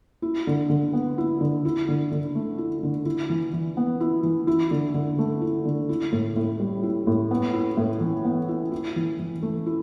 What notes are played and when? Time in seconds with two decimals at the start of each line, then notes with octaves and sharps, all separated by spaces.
0.22 E4
0.47 D3
0.70 D3
0.93 B3
1.18 E4
1.41 D3
1.65 E4
1.88 D3
2.11 D3
2.35 A3
2.58 E4
2.83 D3
3.05 E4
3.30 E3
3.53 E3
3.77 B3
4.00 E4
4.23 E3
4.47 E4
4.71 D3
4.94 D3
5.18 A3
5.42 E4
5.65 D3
5.89 E4
6.12 A2
6.36 A2
6.60 G3
6.83 E4
7.07 A2
7.31 B3
7.53 E4
7.77 A2
8.01 E3
8.25 B3
8.48 E4
8.72 E4
8.96 E3
9.19 E3
9.43 A3
9.66 E4